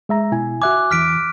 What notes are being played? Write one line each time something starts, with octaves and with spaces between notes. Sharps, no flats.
G#3 E5 A#5
B2 E4 G#5
F#4 E5 G#5 D6 F#6
E2 E3 F6 B6 D7